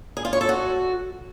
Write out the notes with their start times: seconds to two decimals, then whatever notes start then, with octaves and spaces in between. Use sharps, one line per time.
0.17 G#4
0.25 F4
0.33 C#5
0.41 A4
0.49 F#4